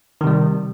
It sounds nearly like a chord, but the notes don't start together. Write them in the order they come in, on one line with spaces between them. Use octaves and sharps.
D#3 C3 G3